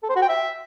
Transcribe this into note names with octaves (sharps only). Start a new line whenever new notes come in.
A4
C5
F#4
G5
E5